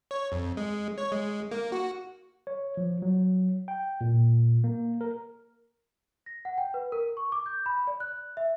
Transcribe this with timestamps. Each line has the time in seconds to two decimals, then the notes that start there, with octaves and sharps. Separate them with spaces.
0.11 C#5
0.32 F2
0.57 G#3
0.98 C#5
1.12 G#3
1.51 A#3
1.72 F#4
2.47 C#5
2.77 F3
3.02 F#3
3.68 G5
4.01 A#2
4.64 A#3
5.01 A#4
6.26 A#6
6.45 F#5
6.58 G5
6.74 B4
6.92 A#4
7.17 C#6
7.32 D6
7.46 G6
7.66 B5
7.87 D5
8.00 F#6
8.37 E5